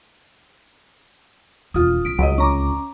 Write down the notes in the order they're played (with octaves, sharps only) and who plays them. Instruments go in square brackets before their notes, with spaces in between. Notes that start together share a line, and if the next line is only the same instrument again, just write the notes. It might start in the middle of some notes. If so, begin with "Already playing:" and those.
[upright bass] E1 D#2 [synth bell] F4 D#6
[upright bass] C2 [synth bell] B6 D7
[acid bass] C#2 [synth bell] F#3 D#5
[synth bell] C#4 A#5 D6